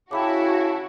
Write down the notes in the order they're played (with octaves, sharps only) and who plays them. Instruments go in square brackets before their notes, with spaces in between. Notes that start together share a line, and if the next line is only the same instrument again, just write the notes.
[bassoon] C#3 [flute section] E4 A5 [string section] F#4 [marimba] G5 B5 D6